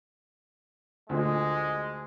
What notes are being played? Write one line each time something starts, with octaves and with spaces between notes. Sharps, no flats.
D2 A#2 D3 G#3